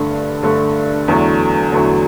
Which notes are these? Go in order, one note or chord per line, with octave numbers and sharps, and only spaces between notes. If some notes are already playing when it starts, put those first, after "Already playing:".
Already playing: G2 D3 A3
G2 D3 A3
E2 D3 F#3 A3
E2 D3 F#3 A3